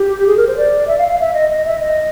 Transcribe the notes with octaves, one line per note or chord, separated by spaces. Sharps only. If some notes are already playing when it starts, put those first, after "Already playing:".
Already playing: G4
G#4
A#4
C5
D5
E5
F5
F5
E5
D#5
D#5
E5
D#5